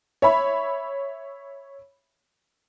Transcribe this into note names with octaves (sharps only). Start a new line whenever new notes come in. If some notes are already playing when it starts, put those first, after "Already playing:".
C#5 E5 B5